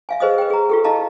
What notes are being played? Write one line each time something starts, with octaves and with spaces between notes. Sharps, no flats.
E5 F5 G#5
G#4 B4 C5 D#5 F5 D#6
B4 G5
G#4 A#5
F4 G4 A4
E4 G4 D#5 F5 A5 A#5